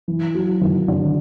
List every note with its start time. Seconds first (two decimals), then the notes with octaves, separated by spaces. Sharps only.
0.08 E3
0.34 F#3
0.61 D#3
0.88 D3